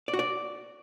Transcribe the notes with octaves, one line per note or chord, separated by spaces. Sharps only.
D5
F#4
D5